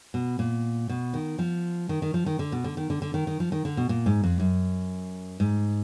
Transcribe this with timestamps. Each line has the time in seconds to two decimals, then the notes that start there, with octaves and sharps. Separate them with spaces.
0.14 B2
0.39 A#2
0.89 B2
1.14 D#3
1.39 F3
1.89 D#3
2.02 D#3
2.14 F3
2.26 D#3
2.39 D3
2.52 B2
2.64 D3
2.77 D#3
2.90 D3
3.02 D3
3.14 D#3
3.27 D#3
3.40 F3
3.52 D#3
3.65 D3
3.77 B2
3.89 A#2
4.06 G#2
4.24 F2
4.40 F#2
5.40 G#2